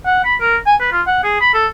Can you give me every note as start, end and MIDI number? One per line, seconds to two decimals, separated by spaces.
0.07 0.21 78
0.25 0.35 83
0.41 0.56 70
0.67 0.75 80
0.81 0.89 71
0.92 1.02 65
1.07 1.23 78
1.24 1.40 68
1.41 1.51 83
1.54 1.67 69